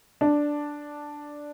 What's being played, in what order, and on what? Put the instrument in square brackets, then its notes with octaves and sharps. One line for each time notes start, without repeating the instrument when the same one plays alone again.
[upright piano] D4